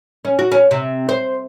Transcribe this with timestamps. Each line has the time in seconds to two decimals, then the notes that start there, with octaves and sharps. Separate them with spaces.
0.25 C#4
0.39 F#4
0.52 C#4
0.71 C3
1.09 C5